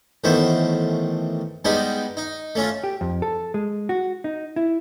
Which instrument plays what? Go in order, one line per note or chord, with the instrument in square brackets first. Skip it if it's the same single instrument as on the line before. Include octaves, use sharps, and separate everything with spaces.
[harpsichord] A1 D#3 A3 B3 C5
G3 G#3 B3 D#4 G4
D#4
A3 C#4 F4
[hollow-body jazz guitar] G4
F2
A4
G#3
F#4
D#4
E4